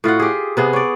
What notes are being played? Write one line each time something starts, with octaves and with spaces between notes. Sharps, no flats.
A2 F4 F#4 F#5
G4 G#4
C3 B3 G#4
C#5 D5